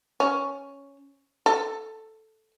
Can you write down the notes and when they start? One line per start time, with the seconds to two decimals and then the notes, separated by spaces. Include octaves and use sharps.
0.20 C#4
1.46 A4